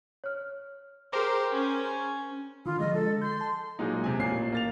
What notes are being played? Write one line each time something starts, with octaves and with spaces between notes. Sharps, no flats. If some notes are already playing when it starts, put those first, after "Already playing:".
C#5 F6
G4 G#4 A#4 C5 A#5 D6
C#4
D3 D#3 F4
D3 F3 G#3 D#5
A4
C6 G6
A5
A#2 F#3 G#3 D#4
C3 G#5
A1 A#2 C7
A#3 A6 F7